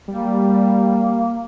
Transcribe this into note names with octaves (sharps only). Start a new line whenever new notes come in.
G3 A#3